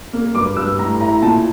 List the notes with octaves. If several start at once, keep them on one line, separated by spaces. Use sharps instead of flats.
A#3
G2 D6
G2 E6
A2 A#5
E4 A#5
A#2 A5